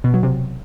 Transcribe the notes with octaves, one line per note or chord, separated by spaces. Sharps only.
B2
F#3
C3